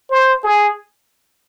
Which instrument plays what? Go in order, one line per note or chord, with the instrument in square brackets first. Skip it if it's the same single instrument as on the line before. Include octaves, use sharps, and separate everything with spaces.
[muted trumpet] C5
G#4